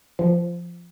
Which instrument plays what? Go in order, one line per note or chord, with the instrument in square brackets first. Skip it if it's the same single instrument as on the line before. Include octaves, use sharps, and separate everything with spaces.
[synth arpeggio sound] F3